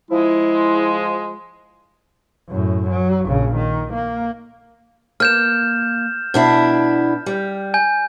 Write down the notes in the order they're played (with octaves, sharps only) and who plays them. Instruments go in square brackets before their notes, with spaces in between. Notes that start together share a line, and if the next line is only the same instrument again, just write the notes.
[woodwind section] F3 G#3 [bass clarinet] E4
[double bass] F#2 A2
F#3
A#1 C#3
D#3
A#3
[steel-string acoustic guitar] A#3 [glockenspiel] F6 G6 E7
[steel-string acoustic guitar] B2 D4 E4
G3
[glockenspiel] G#5 G6